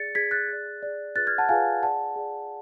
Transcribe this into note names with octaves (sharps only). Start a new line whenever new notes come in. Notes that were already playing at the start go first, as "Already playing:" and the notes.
Already playing: G#4 D5 A6 C#7
G#4 D5 G#6 B6
F#6 A6
G#4 D5
G#4 D5
F4 G#4 B4 D5 F#6 A6
F6 G#6
F#5 A5
F4 G#4 B4 D5 F5 G#5
G#4 D5 F#5 A5
G#4 D5